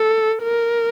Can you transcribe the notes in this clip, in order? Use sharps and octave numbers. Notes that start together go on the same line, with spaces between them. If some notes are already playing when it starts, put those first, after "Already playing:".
Already playing: A4
A#4